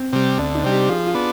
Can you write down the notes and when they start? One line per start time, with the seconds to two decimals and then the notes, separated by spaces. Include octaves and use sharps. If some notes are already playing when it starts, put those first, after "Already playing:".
Already playing: C4
0.13 C3 G3
0.38 D2 D4
0.55 D#4
0.64 C3 G3
0.72 G4
0.89 F3 G#4
1.07 F4
1.14 B3 D4